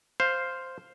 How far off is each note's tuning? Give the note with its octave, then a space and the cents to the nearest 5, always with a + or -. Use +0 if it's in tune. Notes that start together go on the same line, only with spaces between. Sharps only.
C5 +0 F5 +0